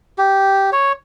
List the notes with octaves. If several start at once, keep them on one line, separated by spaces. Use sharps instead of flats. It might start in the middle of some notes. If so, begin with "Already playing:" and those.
G4
C#5